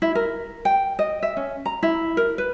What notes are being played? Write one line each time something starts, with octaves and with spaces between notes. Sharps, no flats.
E4
A#4
G5
D#5
E5
C#4
A#5
E4
A#4
B4